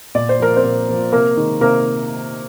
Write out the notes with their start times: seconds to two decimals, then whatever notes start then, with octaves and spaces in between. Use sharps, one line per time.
0.15 A#2 D5
0.29 C5
0.40 F3 A#3 A#4
0.56 C4 C5
0.64 A#2
0.89 F3 A#3
1.12 C3 A#3 A#4
1.37 D#3 G#3
1.61 C3 A#3 A#4